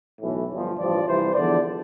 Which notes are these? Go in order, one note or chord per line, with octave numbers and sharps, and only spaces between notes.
B1 A2 E3
G1 G2 F3
A1 G2 F3 D5
C2 C3 E3 C5
E2 D3 F3 D5